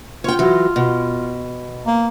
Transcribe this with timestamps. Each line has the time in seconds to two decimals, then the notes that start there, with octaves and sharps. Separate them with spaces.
0.24 F4 C#5 G5
0.39 E3 F#3
0.76 B2
1.87 A#3